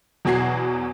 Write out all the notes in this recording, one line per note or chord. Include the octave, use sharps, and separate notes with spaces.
E2 B2 F#3 F#4 G#6 C7